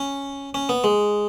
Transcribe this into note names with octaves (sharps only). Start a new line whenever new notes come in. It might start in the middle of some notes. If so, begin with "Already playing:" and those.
Already playing: C#4
C#4
B3
G#3